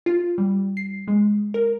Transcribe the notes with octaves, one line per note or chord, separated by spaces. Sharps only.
F4
G3
C7
G#3
A#4